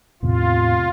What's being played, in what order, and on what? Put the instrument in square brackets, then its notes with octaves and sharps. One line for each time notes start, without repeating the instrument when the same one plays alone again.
[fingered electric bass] E2 A2 C3 [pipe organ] F4